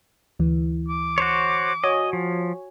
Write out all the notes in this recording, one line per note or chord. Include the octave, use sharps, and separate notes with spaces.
D2 E3
D6
F#4 C5 C#5
F#4 C#5 D#5 G#5
F3